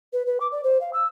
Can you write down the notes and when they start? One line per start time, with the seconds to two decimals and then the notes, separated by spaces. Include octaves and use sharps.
0.13 B4
0.26 B4
0.40 D6
0.51 D5
0.63 C5
0.80 F5
0.93 E6